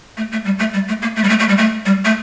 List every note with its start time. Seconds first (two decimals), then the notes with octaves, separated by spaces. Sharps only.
0.17 A3
0.32 A3
0.45 G3
0.59 A3
0.74 G3
0.88 A3
1.02 A#3
1.16 A3
1.24 G3
1.29 A3
1.40 A3
1.49 G3
1.58 A3
1.86 G3
2.05 A3